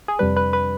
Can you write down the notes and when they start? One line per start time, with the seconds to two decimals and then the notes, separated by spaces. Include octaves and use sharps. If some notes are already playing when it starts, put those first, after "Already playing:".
0.08 G#4
0.19 F2 C3 G3 D4 B4
0.37 B4
0.53 B4